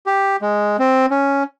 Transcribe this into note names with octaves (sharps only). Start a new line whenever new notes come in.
G4
G#3
C4
C#4